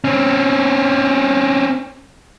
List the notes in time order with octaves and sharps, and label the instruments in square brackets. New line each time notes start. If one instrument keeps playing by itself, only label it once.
[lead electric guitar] C4 C#4